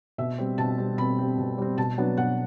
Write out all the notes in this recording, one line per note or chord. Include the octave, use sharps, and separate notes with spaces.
B2 E5
G3 C4
B2 A5
G3 C4
B2 B5
G3 C4
B2
G3 C4
B2 A5
F#3 B3 D4
B2 F#5